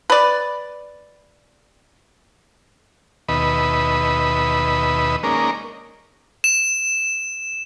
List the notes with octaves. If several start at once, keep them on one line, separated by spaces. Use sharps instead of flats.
B4 D5
D#2 B2 B4 D#5 E5 B5
G#3 A#3 C#4 D#4 A#4 D5
E7